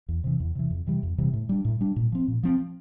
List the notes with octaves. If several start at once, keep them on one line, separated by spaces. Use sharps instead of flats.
E2
C3 E3
E2
C3 E3
F2
C3 E3 G3
F2
C3 E3 G3
A2
G3 D4
A2
G3 D4
A#2
F3 C4
A#2
F3 C4